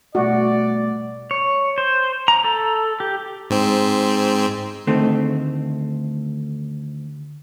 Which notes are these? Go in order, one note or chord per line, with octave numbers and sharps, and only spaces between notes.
B2 G3 A3 F#4 D5
C#5
C5
A#5
A4
G4
G#2 C4
D2 D#3 A3 C4